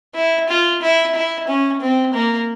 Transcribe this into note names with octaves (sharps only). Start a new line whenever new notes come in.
E4
F4
E4
E4
C#4
C4
A#3